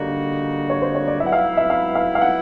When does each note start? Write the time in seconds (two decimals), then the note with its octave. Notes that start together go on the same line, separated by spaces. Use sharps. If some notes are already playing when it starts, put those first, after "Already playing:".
Already playing: D3 G3 A#3 D#4 F#4
0.70 C#5
0.82 C5
0.95 C#5
1.07 D5
1.20 F#3 B3 E4 E5
1.26 F#5
1.32 F5
1.57 E5
1.70 F5
1.95 F5
2.15 F5
2.21 F#5